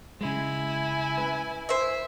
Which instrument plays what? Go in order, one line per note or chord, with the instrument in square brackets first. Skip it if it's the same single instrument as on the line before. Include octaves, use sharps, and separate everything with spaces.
[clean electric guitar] C#3 G#3 [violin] E4 G#5
[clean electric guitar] B4
[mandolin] C5 E5